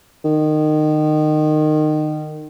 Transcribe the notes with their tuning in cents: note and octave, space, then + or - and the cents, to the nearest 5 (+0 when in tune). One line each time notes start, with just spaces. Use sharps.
D#3 -25